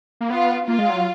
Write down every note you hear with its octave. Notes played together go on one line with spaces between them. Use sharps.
A#3
B3 F4
A#3 F4
G#3
F#3